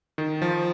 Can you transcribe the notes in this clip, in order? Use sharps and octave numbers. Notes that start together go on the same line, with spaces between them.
D#3
F3